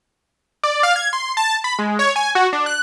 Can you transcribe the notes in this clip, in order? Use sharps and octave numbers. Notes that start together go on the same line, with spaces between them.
D5
F5
G#6
C6
A5
B5
G#3
C#5
G#5
F#4
D4
F#6